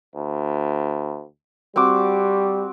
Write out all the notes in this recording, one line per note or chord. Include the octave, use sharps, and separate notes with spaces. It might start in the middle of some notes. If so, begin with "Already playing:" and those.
D2
G3 C4 F#4 D6